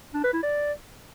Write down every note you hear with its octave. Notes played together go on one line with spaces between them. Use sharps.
D4
B4
E4
D5